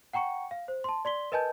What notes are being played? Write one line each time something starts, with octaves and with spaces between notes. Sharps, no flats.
F#5 G5 A#5 C#6 C#7
F5
C5
A5 C6
D5 C6 B6 G7
A#4 B4 D#5 G#5 A5 G6